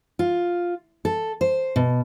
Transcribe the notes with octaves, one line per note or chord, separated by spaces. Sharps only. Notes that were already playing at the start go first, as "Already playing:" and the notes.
F4
A4
C5
B2